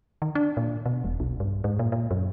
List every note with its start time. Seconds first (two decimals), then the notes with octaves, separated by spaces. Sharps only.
0.22 D#3
0.35 D4
0.57 A#2
0.86 B2
1.04 E1
1.20 B1
1.40 G2
1.64 G#2
1.79 A#2
1.92 A#2
2.11 F#2